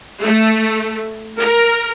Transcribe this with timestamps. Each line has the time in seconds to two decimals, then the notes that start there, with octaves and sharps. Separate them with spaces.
0.22 A3
1.39 A#4